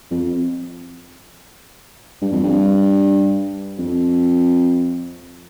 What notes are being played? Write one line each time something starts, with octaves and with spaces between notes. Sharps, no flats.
F2
G2
F2
G2
F2